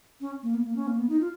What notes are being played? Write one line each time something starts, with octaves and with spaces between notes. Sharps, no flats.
C#4
A#3
B3
A#3
C#4
A#3
B3
D#4
F4